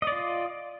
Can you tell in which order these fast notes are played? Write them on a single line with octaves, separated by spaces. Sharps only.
D#5 D5 F4